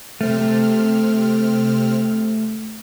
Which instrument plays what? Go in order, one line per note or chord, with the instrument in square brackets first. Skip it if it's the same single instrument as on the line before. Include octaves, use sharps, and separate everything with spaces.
[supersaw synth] C3 C4 F6 [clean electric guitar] A3